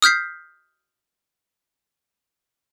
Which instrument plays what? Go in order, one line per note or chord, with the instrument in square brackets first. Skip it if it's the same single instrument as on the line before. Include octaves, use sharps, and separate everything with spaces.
[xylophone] D#6 F6 G6 B6 C7